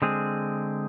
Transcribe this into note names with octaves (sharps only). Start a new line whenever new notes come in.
D3 G#3 C4 G#4